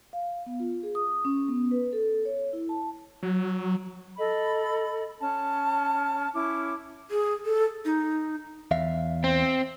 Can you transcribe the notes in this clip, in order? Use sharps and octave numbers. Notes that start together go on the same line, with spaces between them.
F5
B3
F4
G#4
D#6
C#4
B3
B4
A4
C#5
E4
A5
F#3
A4 D#5 B5
C#4 A5
C#4 E4 D6
G#4
A4
D#4
E2 E5 F5
C4